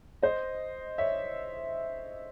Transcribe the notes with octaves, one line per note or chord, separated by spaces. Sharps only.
C5 D#5
C#5 E5